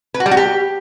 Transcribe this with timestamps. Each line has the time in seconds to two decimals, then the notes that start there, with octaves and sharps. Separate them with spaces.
0.14 B4
0.20 F#4
0.26 G3
0.31 F#4
0.37 G4